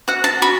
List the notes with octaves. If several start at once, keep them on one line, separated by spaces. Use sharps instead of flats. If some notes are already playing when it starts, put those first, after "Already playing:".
F#4 F#5
A5
F#4 B5